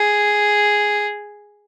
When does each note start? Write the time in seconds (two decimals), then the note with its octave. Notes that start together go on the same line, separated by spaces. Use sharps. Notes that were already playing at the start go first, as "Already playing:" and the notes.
Already playing: G#4